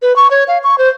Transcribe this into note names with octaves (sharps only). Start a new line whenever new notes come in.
B4
C#6
C#5
F5
C#6
C5